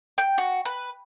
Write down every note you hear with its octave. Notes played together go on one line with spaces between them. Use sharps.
G5
F#4
B4